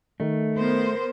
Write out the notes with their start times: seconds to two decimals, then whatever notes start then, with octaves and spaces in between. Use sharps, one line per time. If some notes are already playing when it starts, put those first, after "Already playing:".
0.20 D#3 A3
0.56 B3 A#4 C5